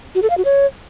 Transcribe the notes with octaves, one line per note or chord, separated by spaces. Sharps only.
F#4
A4
F5
F#4
C#5